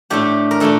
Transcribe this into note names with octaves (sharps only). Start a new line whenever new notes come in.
A2 A3 D4 G4
A#4
A#2 A3 D4 A4